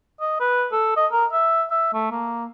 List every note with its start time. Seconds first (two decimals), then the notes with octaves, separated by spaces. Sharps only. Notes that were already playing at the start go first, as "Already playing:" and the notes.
0.21 D#5
0.40 B4
0.72 A4
0.97 D#5
1.12 A#4
1.33 E5
1.71 E5
1.93 A3
2.11 A#3